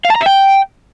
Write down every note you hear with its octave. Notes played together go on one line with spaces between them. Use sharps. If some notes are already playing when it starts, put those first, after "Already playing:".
F5
A5
A#5
E5
G5